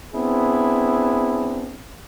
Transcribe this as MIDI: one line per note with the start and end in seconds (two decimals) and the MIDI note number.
0.14 1.79 59
0.14 1.79 60
0.14 1.79 62
0.14 1.79 64
0.14 1.79 68